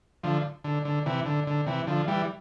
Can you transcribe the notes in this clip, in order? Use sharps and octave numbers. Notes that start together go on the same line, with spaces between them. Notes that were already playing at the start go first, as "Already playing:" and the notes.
D3 F3
D3
D3
C3 E3
D3
D3
C3 E3
D3 F3
E3 G3